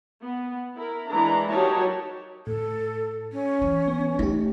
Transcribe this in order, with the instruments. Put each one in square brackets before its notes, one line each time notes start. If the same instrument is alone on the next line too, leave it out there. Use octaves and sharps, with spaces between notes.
[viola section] B3
E4 A#4
E3 G#3 D4 A#5
F#3 D#4 G4 A#4 C#5 A5
[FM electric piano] A2 [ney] A4
[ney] C#4
[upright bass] E3
[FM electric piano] B3
[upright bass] A3 [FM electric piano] D#4 G4